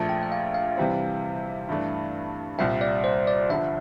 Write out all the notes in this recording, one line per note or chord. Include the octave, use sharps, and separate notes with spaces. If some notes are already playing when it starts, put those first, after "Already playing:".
Already playing: A#1 A#2 F3 A3 A5
G5
E5
F5
F5
C3 E3 G3 C4
G2 E3 A3 D4
C2 A#2 G3 C4 E5
D5
C5
D5
G1 G2 D3 F3 E5